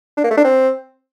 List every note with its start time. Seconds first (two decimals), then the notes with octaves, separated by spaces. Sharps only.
0.17 D4
0.24 A#3
0.31 A3
0.37 D4
0.44 C4